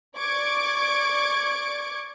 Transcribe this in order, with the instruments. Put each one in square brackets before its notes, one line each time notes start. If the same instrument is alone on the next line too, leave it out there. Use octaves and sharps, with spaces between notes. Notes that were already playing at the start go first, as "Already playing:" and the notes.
[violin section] D5 C#6 D6 G#6 D7